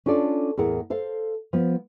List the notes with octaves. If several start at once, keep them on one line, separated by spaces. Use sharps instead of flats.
C#4 D4 F4 A4 D5
E2 A2 G#4 A#4 F#5
A4 C5 F5
F3 B3